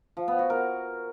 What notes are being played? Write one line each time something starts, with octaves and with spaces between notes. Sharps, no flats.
F3
B3
F#4
A#4